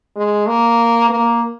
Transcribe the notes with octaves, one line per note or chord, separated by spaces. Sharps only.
G#3
A#3
A#3